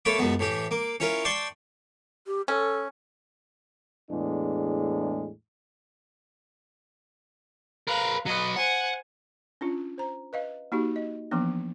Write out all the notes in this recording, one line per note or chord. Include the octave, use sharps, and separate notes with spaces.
A3 A#3 C#5 A5 B5 D6
C#2 F#2 G#3 B3
A2 E3 G4
A#3 D6
C#4 E4 F4 A#4
D5 G5 A5 C6 C#6
G4
C#4 A4
E2 A2 G#3 D4
A#4 B4 F5
F#3 B3 D#5
C5 F#5 G#5
C#4 D4 F4
C5 A#5
B4 D#5 F5
A#3 D#4 F#4 G4
D#5
E3 F3 A#3 B3 D4